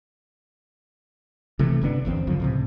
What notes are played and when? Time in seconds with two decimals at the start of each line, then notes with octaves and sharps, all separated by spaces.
1.59 C3 E3 A3
1.81 G1 C3 B3 D4
2.05 G1 E2 A#2 C4
2.27 C#2 F#2 D3 F3
2.40 C#2 A2 C3